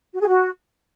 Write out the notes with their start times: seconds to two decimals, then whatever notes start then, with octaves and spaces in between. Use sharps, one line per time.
0.13 F#4
0.20 G#4
0.27 F#4